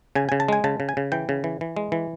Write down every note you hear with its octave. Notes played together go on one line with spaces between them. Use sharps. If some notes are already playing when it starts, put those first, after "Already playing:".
C#3 G#5
C#3 G#5
A5
G#3 G#5
C#3 A5
C#3
G#5
C#3
E3 G5
C#3
E3
E3
G#3
E3